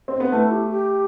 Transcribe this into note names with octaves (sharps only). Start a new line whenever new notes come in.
C4
B3
A3 E4
G4
G4